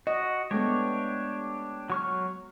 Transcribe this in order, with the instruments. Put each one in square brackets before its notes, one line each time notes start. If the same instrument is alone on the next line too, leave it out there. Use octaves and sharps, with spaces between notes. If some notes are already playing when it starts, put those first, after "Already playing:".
[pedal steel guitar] F#4 [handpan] D#5
[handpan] G#3 A3 B3 [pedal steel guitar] D4 G4 C#5
[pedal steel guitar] F#3 C#6 F6